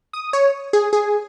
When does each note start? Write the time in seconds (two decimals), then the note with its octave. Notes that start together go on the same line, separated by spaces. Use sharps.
0.13 D#6
0.33 C#5
0.73 G#4
0.93 G#4